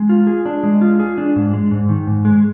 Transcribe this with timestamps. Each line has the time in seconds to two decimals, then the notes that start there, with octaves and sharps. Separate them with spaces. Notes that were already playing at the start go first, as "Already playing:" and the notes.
Already playing: G#3
0.09 F4
0.27 G#4
0.46 D4
0.63 G#3
0.81 F4
0.99 G#4
1.18 D4
1.36 G#2
1.53 G#3
1.71 G#2
1.89 D#3
2.07 G#2
2.25 G#3